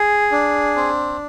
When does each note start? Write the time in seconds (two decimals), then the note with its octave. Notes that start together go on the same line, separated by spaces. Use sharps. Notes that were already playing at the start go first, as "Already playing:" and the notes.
Already playing: G#4
0.32 D4
0.76 C4